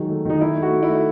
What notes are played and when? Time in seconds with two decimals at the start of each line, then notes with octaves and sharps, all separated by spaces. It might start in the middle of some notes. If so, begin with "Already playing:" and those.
Already playing: D#3 F#3 G#3
0.09 A3
0.25 D#3 D#4
0.41 A3 E4
0.56 A3
0.62 F#4
0.73 A3
0.83 E4
0.88 A3